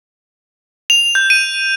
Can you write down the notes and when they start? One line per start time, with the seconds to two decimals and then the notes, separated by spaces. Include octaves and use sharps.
0.90 F7
1.15 G6
1.30 D#7